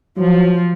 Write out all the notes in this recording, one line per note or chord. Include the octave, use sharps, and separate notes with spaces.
F3 F#3